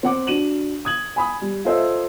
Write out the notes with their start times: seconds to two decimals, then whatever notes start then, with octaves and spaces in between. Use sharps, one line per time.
0.03 C4 F#5 D6
0.27 D4 F#4 D#7 E7 F#7
0.85 D#6 G#6 F#7
1.16 G#5 B5 D#6
1.42 G3
1.65 F4 A4 C5 D#5 E5 E6